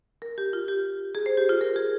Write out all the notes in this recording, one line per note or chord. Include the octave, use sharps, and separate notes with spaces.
A#4
G4
F4
G4
G#4
C5
G4
F4
A#4
G#4